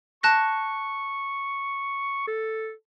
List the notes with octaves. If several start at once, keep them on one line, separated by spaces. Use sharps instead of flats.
A5 C#6 F#6 A#6
A4